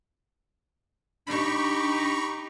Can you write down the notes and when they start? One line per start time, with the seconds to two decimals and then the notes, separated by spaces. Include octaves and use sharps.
1.27 D4 D#4 G4 B5 C#6